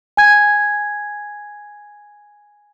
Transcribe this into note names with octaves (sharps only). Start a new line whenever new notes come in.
G#5 G#6